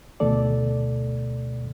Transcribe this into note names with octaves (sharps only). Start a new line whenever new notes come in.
D2 B2 D#3 A3 A4 D5